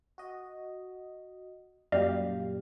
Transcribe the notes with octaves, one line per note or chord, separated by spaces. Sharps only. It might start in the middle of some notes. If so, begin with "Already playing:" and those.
F#4 D#5
F#2 A#2 G3 G4 D5 F5